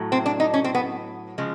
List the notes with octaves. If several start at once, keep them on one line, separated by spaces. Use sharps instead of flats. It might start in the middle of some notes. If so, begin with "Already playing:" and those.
Already playing: A2 F#3 A3
C4
D4
D#4
C#4
C4
B3
C#3 F3 G#3